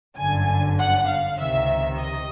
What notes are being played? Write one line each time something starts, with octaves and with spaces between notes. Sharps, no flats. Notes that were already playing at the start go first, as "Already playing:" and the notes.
G1 F#2 D3 G#5
F#5
F5
C#2 C3 D#3 E5
D#5